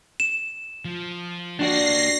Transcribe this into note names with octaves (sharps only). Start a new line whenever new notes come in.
E7
F3
A#3 D4 F#4 G4 D5 A#6 C7